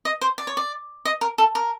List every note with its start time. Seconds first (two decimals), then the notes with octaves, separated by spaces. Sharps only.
0.05 D#5
0.21 C5
0.38 D5
0.47 C#5
0.57 D5
1.05 D#5
1.21 A#4
1.38 A4
1.55 A#4